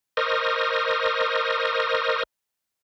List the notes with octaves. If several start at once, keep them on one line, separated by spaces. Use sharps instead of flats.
A#4 C5 D#5 C#6 D#6 F6